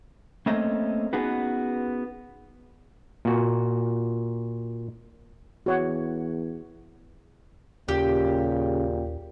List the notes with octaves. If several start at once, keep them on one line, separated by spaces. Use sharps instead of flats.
A3 A#3 C4 C#4 A4 D#5
B3 C#4 D#4 F#4 G#4 B4
A#2 F#4
E2 F#4 C#5 F#5
D#2 A#2 C#3 G4